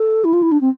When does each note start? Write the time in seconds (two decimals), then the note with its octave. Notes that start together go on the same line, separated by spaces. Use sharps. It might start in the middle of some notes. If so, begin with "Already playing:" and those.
Already playing: A4
0.24 E4
0.33 F4
0.42 E4
0.52 D4
0.61 C4